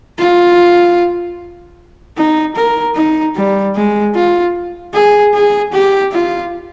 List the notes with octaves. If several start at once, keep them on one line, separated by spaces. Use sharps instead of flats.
F4
D#4
A#4
D#4
G3
G#3
F4
G#4
G#4
G4
F4